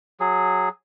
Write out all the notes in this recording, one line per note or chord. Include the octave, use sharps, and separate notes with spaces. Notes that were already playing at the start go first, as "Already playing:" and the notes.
F#3 G#4